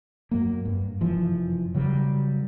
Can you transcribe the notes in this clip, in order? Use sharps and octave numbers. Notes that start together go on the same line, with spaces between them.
F#2 F#3 A#3
G2
F1 F#2 E3 F3
C#3 F#3 G3